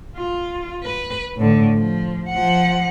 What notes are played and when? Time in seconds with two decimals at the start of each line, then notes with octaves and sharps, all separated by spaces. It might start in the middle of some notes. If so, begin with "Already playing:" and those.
0.17 F4
0.84 B4
1.36 A2 D3
1.73 F3
2.29 F3 F#5